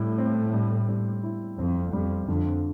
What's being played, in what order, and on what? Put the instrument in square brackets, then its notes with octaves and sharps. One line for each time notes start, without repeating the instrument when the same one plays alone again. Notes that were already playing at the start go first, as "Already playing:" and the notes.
Already playing: [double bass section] A2 [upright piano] G3 E4
[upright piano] C4
G3
G3
E4
[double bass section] F2 [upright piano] C4
[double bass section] F2 [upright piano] G3
[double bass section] F2 [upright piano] D3